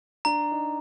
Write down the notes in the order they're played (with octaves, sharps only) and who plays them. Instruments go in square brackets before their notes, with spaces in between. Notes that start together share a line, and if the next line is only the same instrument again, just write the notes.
[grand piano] D4 [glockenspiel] A#5
[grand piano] D#4